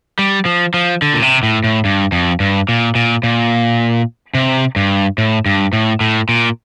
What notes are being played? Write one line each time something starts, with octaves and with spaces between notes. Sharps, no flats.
G3
F3
F3
D3
A#2
C3
A2
A2
G2
F2
G2
A#2
A#2
A#2
C3
G2
A2
G2
A2
A2
A#2